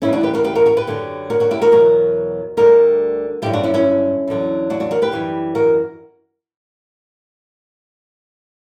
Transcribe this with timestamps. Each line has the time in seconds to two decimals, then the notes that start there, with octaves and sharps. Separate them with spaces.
0.02 D2 C#3 E3 G3 C#4 E4
0.13 D4 F#4
0.23 G4 B4
0.34 F#4 A#4
0.44 G4 B4
0.55 F#4 A#4
0.66 F#4 A#4
0.77 G4 B4
0.87 F#2 D3 F#3
1.30 F#4 A#4
1.40 F#4 A#4
1.51 E4 G4
1.61 F#4 A#4
1.72 E2 B2 F#3 F#4 A#4
2.57 D2 D3 G3 F#4 A#4
3.42 G2 D3 F#3 E4 G4
3.53 D4 F#4
3.63 C#4 E4
3.74 C#4 E4
4.28 E2 D3 F#3
4.70 D4 F#4
4.80 D4 F#4
4.91 F#4 A#4
5.02 G4 B4
5.12 F#2 E3 G3
5.55 F#4 A#4